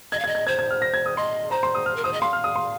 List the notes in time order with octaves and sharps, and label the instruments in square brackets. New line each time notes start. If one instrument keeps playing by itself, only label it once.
[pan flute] D#5 [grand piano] G#6
[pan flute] F5
[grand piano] G#6
[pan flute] D#5
[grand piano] G#6
[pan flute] C5 [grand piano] G#6
[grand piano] G#6
F6
A#6
G#6
D#6
[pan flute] D#5 [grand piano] C6
[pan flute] C5 [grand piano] A#5
[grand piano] C6
D#6
F6
[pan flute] A#4
[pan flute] C5 [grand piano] D#6
[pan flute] D#5
[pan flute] F5 [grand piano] C6
[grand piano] F6
D#6
C6